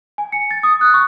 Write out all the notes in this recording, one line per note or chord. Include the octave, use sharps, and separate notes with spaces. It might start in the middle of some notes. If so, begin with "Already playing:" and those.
G#5
C#7
A6
D#6
F#6
C#6